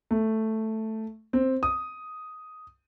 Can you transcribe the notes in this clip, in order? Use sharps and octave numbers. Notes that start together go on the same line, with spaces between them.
A3
C4
D#6